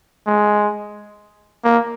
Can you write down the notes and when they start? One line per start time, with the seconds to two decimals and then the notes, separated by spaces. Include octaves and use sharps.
0.27 G#3
1.64 A#3